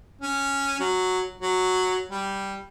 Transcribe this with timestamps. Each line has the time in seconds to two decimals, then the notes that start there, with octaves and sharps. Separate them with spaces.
0.21 C#4
0.80 F#3
1.40 F#3
2.11 G3